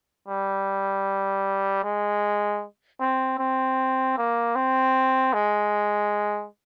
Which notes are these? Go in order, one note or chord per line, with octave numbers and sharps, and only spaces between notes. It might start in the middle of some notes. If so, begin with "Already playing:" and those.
G3
G#3
C4
C4
A#3
C4
G#3